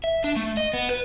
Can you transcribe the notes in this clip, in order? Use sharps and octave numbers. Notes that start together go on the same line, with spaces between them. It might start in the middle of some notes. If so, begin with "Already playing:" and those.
E5
D4
A3
D#5
B3
B4